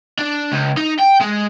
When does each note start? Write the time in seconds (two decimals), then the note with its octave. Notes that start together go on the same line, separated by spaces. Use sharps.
0.19 D4
0.52 C#2
0.77 D#4
1.00 G5
1.22 G#3